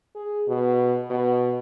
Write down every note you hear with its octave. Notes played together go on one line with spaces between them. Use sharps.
G#4
B2
B2